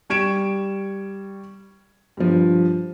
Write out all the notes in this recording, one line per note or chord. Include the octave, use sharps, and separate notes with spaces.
G3 C#6 G#6 D7 E7
G2 F3